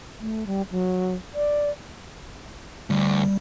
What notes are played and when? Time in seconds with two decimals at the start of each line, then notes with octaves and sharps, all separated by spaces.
0.21 A3
0.47 G3
0.71 F#3
1.35 D5
2.90 D2 G3